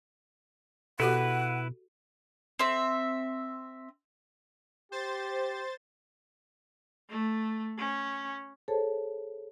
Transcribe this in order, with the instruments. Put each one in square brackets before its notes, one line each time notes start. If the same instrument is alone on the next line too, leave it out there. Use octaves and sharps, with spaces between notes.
[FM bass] B2 [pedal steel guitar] E4 B4 [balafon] F#4 G4 A4 [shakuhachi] F#5
[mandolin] C4 E5
[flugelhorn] G4 [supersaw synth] C5 A6
[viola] A3
C#4
[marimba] G#4 A4 C5 C#5 A5